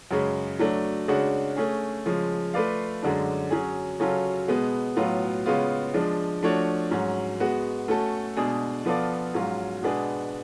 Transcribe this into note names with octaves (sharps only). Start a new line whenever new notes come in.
F#2 C#3 G#3
F#3 A3 D4
C#3 G#3 D4 F#4
A3 C#4 G#4
C#3 F3 G#3
A3 F4 B4 D5 F5
F#2 D3 G#3 D4
F#3 C#4 G#4
C#3 F#3 C#4 F4 A4
B2 G#3 B3
A2 F#3 B3 F4
C#3 G#3 B3 F4
F3 G#3 D4
F3 A3 D4 F#4 C#5
G#2 F#3 C#4
G#3 B3 F#4
A3 C#4 F#4 A4
B2 G#3 D4 G#4
F3 B3 F4 A4 D5
G#2 F#3 C#4 F4
B2 G#3 B3 D4 G#4